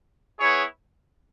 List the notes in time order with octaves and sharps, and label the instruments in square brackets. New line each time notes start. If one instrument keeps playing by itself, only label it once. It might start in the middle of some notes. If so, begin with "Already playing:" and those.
[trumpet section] B3 E4 G#4 C#5